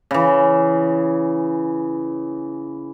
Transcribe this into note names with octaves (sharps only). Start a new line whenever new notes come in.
C#3 E3